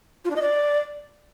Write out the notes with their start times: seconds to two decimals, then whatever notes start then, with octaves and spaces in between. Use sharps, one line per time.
0.24 F4
0.30 D4
0.36 D#5
0.41 D5